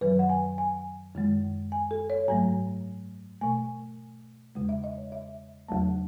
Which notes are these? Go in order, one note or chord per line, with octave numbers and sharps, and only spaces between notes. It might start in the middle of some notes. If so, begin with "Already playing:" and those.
F#2 D#3 F#3 B4
F#5
G#5
G#5
F#2 D#3 G#3
G#5
A4
C#5
G#2 F#3 A3 G#5
B2 A3 G#5
E2 C#3 G#3
E5
D#5
C#5
E5
E2 C#3 F#3 A3 A5